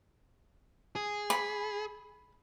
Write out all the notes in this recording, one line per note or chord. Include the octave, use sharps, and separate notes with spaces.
G#4
B5